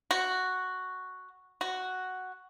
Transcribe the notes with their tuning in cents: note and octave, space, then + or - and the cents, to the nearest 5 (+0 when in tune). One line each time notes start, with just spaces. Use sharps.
F#4 +0
F#4 +0